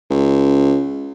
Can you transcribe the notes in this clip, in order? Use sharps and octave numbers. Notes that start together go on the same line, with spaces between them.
C#2